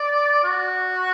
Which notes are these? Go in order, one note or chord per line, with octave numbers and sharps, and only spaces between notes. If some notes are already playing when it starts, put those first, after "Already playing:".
Already playing: D5
F#4